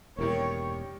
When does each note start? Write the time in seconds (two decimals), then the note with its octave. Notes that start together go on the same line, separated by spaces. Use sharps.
0.18 E1 D#3 G3 A#3 E4 G4 A#4 C#5